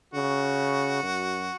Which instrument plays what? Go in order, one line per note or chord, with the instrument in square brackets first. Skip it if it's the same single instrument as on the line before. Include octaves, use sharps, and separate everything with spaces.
[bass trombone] C#3 [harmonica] F#4
[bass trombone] F#2